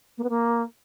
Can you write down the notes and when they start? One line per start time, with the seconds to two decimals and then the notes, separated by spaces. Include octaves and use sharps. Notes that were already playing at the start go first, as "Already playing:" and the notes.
0.17 A#3
0.23 B3
0.29 A#3